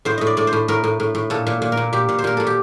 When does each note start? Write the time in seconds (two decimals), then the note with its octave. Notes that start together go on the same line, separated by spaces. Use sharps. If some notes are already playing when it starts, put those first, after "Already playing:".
0.05 A2 C5
0.18 A2 D#5
0.27 D5
0.37 A2 D5
0.47 C5
0.53 A2
0.68 A2 A#4
0.84 A2
1.00 A2
1.15 A2
1.30 A#2 A4
1.47 A#2
1.62 A#2
1.72 A#4
1.77 A#2
1.93 A#2 G4
2.09 A#2
2.19 C5
2.24 A#2 A#4
2.37 A#2 A4
2.47 G4